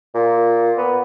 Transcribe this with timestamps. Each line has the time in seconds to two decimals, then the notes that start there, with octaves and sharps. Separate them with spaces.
0.14 A#2
0.78 B3